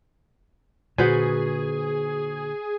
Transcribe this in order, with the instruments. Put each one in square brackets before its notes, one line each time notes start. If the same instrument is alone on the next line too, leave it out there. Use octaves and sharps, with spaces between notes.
[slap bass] A#2 D3 [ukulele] F#4 B4 C5 [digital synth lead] G#4